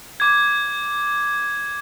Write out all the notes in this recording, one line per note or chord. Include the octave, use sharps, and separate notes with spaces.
D6 G#6